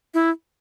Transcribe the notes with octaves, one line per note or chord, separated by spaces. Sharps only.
E4